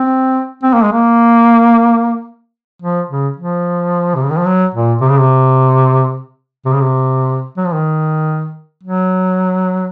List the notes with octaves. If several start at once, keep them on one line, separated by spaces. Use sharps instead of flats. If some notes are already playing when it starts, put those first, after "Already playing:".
Already playing: C4
C4
A#3
G#3
A#3
F3
C#3
F3
C3
C#3
D#3
F3
F#3
A#2
C3
C#3
C3
C3
C#3
C3
F#3
F3
D#3
F#3